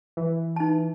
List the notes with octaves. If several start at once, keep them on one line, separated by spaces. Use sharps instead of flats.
E3
D#4 A5